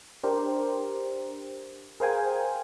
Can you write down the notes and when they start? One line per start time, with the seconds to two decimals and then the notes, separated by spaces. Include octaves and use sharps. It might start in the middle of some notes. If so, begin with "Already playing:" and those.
0.23 D4 G4 A#4 C5
2.00 G#4 A#4 C5 F5 G5 G#5